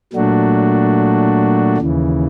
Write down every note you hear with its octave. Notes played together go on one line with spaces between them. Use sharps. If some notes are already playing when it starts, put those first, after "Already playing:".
A#2 F#3 A3 D4 F#4
D#2 C#3 E3